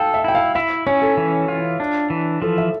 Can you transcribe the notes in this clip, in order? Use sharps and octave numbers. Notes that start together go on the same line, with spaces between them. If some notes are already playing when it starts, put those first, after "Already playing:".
Already playing: A4 F5 G5
E5
E4 G5
F5
E4 E5
C#4 C#5
A4
E3
F4
D4
E3
F3 A4
E5